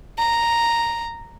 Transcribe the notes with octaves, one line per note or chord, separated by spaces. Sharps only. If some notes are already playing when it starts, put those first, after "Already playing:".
A#5